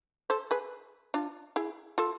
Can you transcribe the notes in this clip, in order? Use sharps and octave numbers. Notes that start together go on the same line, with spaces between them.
A4 C5
G#4 B4
D4 F4
E4 G#4
F4 A4